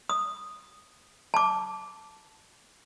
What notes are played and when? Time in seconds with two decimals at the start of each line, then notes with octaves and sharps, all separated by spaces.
0.09 D#6
1.34 A5 D6